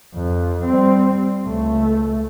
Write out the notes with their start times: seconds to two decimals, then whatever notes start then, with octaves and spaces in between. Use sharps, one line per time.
0.14 F2
0.64 G3 C4
1.45 C#2 A3